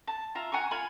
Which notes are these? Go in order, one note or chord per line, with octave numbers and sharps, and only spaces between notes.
A5
F4 E5 A#5
F#5 G#5 A#5 C#6
F4 G#5 B5